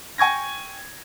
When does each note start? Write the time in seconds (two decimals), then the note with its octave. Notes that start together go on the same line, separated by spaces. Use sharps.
0.18 G5 G#5 C#6 G#6 A#6